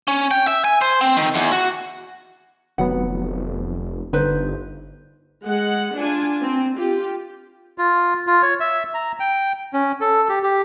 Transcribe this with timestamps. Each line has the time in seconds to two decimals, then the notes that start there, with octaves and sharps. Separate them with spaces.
0.08 C#4
0.31 G5
0.47 E5
0.65 G#5
0.81 C5
1.01 C4
1.17 D#3
1.35 E2
1.52 F#4
2.78 F1 D#3 F#3 B3 F#5
4.13 G1 D3 D#4 B4 C5
5.46 G#3 F#5
5.97 D4 F4 G#5
6.42 C4
6.76 F4 G4
7.78 F4
8.27 F4
8.42 C#5
8.60 E5
8.94 A#5
9.20 G5
9.73 C#4
10.01 A4
10.29 G4
10.43 G4